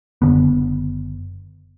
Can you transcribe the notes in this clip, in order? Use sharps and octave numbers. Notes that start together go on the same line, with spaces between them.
F#1 D3 B3